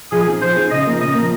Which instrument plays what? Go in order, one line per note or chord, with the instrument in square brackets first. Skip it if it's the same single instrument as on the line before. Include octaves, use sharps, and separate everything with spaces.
[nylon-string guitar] F3 [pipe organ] G#4
[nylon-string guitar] C4 D#4 G#4
[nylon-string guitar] F3 [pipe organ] C5
[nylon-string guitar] C4 D#4 G#4
[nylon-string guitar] C#3 [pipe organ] D#5
[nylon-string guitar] F3 A#3
[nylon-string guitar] C#3 [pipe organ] D#5
[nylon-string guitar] F3 A#3